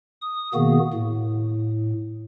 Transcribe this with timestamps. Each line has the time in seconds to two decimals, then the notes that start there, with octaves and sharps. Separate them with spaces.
0.22 D#6
0.54 B2 D#3 A#3 B3 F#4 G#4
0.94 A2